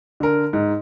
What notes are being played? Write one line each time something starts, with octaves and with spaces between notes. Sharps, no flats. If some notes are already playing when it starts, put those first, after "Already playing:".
D3 A#4
G#2